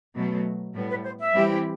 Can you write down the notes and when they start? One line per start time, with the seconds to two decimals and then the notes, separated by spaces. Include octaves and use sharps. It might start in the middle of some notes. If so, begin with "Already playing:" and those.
0.15 B2 F#3 A3
0.74 A2 G3 B3
0.89 B4
1.03 C5
1.19 E5
1.33 E3 G3 C4 E4 G4